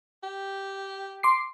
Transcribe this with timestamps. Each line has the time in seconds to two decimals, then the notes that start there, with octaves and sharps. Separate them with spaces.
0.23 G4
1.23 C6 D6 C7